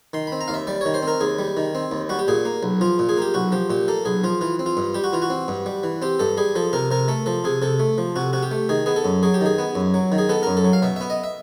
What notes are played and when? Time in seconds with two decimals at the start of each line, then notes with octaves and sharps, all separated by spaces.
0.13 D#3 C6
0.27 C4 B5
0.41 A#5
0.48 D#2 F5
0.54 E5
0.67 G3 D5
0.81 D#3 C#5
0.94 C5
1.03 C4 A#4
1.21 D#2 G#4
1.39 G3
1.57 D#3
1.75 C4
1.91 D#2
2.09 G3 F#4
2.19 G4
2.28 A#2 G#4
2.45 A#3
2.63 B1
2.81 F3 F4
2.99 A#2
3.09 G#4
3.17 A#3 G4
3.34 B1 F#4
3.52 F3 G4
3.70 A#2 G4
3.88 A#3 A4
4.05 B1 G#4
4.24 F3 F4
4.41 E3 F4
4.59 C4
4.66 F4
4.77 G2
4.94 G3 G4
5.04 F#4
5.13 E3 F4
5.22 F#4
5.30 C4
5.48 G2
5.66 G3
5.83 E3
6.02 C4 G4
6.19 G2 A4
6.37 G3 G#4
6.55 F3 A4
6.73 C3 A#4
6.91 C3 A#4
7.08 A3 A4
7.26 F3 A4
7.44 C3 G#4
7.62 C3 A4
7.80 A3
7.98 F3
8.16 C3 F#4
8.33 C3 F#4
8.43 G4
8.51 A3
8.69 D#3 G#4
8.86 B3 G#4
8.96 A4
9.05 F#2
9.23 F#3 G#4
9.34 G4
9.41 D#3 G#4
9.58 B3
9.75 F#2
9.94 F#3
10.12 D#3
10.18 G#4
10.29 B3 A4
10.43 F#2 A#4
10.57 A4
10.65 F#3
10.73 F5
10.82 B2 E5
10.96 B3 E5
11.10 D#5
11.24 E5